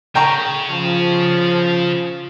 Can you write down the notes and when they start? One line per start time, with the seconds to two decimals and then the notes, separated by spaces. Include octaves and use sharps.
0.15 C#3 G5 A#5 C#6
0.70 F3